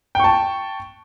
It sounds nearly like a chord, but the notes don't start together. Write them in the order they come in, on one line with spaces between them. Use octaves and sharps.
G5 C#6 A5